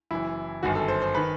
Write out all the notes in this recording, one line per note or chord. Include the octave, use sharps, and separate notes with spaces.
F#1 F#2 E3 E4
G1 F#2 D#3 F#4
A4
C5
C5
D#3 B4